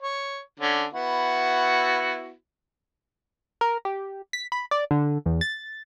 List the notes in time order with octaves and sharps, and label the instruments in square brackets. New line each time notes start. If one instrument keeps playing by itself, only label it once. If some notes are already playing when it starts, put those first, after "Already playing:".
[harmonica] C#5
D3 C#4
B3 E4 F#4
[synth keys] A#4
G4
B6
B5
D5
D3
E2
A6